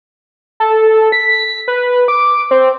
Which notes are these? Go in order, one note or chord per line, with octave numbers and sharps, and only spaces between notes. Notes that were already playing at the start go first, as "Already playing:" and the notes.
A4
B6
B4
D6
C4